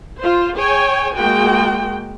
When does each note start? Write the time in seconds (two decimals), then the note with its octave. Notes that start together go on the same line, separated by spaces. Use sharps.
0.20 F4 C5
0.56 G#4 C#5 G5 G#5
1.15 G#3 A#3 F#4 G5